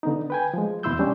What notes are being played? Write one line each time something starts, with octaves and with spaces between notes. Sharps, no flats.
D3 B3 D#4
B4 G5 G#5
F3 G#3
E2 B2 E4 C6 E6 G6
G3 C#4 D4